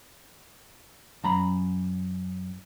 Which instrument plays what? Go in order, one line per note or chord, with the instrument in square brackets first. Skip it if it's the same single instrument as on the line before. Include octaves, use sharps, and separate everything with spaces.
[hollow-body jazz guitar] F#2 A#5 B5